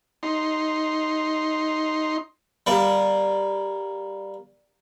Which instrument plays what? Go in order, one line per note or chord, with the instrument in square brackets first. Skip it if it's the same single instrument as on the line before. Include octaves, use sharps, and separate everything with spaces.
[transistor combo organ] D#4 C6
[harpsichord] G3 A#3